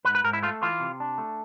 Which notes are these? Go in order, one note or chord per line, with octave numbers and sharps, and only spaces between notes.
G#2 B4
B4
G#2 A#4
E4
A3 F4
E3 F4
C3
D4
A3